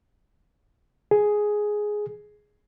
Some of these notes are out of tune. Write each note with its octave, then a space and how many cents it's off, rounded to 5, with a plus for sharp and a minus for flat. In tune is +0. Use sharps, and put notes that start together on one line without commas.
G#4 +5